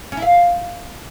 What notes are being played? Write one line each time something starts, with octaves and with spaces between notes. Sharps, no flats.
C#4
E4
F5